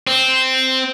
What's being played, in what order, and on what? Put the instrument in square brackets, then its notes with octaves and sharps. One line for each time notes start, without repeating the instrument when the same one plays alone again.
[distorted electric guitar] C4